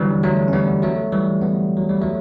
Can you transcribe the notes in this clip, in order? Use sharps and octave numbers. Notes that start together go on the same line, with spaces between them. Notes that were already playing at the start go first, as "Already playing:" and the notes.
Already playing: D3 E3 F#3 G3
F#3 A3
C#4
G3 B3
F#3 A3
E3 G3
G3 B3
F#3
G3
F#3 A3